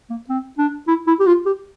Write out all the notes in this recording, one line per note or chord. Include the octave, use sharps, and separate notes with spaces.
A#3
C4
D4
E4
E4
G4
F4
G4